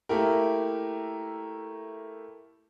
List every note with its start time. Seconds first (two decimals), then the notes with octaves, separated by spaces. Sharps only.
0.09 A3 A#3 E4 G4 A#4